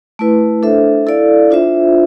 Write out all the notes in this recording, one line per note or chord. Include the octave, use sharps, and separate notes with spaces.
A3 E4 B4
D4 A4 C5 E5
E4 A4 D5 F5
D4 F4 C5 E5